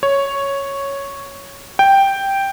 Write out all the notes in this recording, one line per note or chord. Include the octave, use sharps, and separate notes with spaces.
C#5
G5